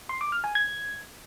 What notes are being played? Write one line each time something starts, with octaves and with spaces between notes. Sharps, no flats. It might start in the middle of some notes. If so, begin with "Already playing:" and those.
C6
D6
F6
G#5
G#6